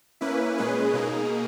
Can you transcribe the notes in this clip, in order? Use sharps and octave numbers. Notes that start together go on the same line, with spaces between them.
A#3 C#4 E4 B4
A#2 G#3 C#4 G#4 B4
B2 A#3 D#4 G#4